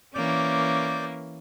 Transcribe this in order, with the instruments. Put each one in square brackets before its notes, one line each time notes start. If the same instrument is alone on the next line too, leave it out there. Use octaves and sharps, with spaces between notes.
[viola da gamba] E3 A#3 C#4 [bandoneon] D5 D6 G6